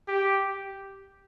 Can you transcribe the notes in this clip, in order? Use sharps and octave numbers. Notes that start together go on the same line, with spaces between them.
G4